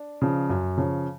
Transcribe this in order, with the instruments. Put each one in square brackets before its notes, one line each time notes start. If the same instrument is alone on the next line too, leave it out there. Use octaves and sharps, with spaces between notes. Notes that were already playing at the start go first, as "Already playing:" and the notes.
Already playing: [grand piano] D4
C#3 F3
F#2
C#3 F3